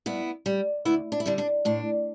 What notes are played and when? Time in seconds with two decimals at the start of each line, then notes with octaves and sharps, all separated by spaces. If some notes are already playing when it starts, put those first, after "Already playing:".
0.06 G2 B3 E4
0.46 G3
0.85 D2 B3 E4
1.12 D4
1.20 E4
1.26 D3 G3 D4
1.38 D4
1.65 A2 D4